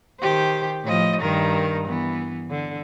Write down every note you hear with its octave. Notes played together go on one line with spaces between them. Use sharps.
D#3 G4 C5
A2 F3 D#5
G2 D#3 A#4
E3 B3
D3